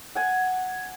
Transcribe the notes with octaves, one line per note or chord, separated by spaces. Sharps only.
F#5 G#5